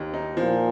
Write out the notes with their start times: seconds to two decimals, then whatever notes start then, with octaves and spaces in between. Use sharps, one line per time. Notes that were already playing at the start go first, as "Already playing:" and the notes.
Already playing: D#2 D#4
0.14 D#4
0.37 A#2 F3